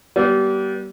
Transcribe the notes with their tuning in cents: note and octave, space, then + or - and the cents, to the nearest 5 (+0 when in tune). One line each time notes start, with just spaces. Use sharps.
G3 -25 B3 -40